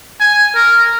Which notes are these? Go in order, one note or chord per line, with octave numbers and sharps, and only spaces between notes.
G#5
A#4